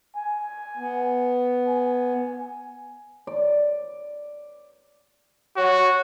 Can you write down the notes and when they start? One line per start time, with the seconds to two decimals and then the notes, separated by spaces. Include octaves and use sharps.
0.16 G#5
0.77 B3
1.68 G#5
3.27 D5
5.57 F#4 C#5